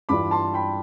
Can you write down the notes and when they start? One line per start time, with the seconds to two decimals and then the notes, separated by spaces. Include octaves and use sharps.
0.09 G2 E3 G3 D4 F4 B5 D6
0.31 A5 C6
0.54 G5 B5